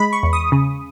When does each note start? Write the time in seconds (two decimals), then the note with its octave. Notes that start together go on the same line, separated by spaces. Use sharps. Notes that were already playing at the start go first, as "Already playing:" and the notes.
Already playing: G#3 B5
0.13 C#6
0.23 E2
0.33 D#6
0.52 C#3